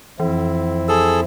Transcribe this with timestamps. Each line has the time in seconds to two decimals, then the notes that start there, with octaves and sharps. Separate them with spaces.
0.20 F2 E3 C4 E4
0.89 G#4 A4 E6